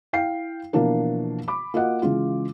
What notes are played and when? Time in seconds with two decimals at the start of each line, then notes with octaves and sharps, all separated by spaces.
0.13 E4 F5 G5 C7
0.73 B2 E3 F3 A#3 D4 A#4
1.48 B5 D6
1.74 A#3 F4 F#4 D#5 F#5
2.02 C#3 E3 G#3 F4